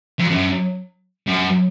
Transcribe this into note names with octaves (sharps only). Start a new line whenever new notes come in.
F2
F2
F#2
F#2